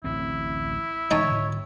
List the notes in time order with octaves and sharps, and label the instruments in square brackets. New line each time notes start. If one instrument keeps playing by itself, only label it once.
[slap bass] D1 A1 C4 [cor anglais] E4
[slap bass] D1 E3 G#3 [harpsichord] D#4 G5 A5 [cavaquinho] C#5
[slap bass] G#2 D3